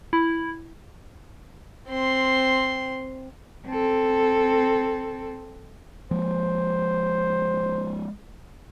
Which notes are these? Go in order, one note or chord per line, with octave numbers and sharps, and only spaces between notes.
E4
C4 C6
C4 A4
F3 G#3 A#3 C5